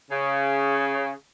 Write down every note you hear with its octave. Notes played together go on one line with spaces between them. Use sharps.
C#3